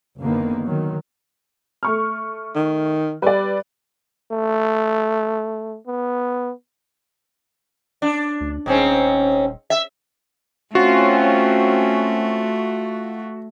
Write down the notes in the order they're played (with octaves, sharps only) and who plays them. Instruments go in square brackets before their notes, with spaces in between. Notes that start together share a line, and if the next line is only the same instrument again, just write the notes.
[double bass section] F#1 D3 D#3 A#3 B3
D#3 F#3
[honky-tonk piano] A3 C#6 F6
[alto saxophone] D#3
[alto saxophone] G3 [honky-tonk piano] B4 D5
[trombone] A3
B3
[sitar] D4
[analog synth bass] D2
[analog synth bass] D#1 [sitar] G#2 C4 C#4
[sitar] E5
[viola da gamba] A3 [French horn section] C4 C#4 [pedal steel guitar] F4 [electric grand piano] F#4